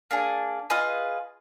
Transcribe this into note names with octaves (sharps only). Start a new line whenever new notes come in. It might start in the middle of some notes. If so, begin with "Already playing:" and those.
A#3 D4 G#4
F4 G#4 B4 D#5